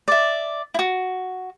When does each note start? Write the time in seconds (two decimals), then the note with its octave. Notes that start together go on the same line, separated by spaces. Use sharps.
0.08 D5 E5
0.74 E4 F#4